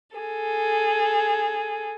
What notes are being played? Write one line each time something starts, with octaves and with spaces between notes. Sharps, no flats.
G#4 A4